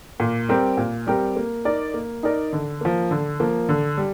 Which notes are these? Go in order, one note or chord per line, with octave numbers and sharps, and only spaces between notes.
A#2
G3 C4 G4 A#4
A#2
G3 C4 G4 A#4
A#3
D#4 A#4 D5
A#3
D#4 A#4 D5
D3
F3 A#3
D3
F3 A#3
D3
G3